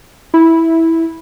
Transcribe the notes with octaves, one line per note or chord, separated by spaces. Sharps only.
E4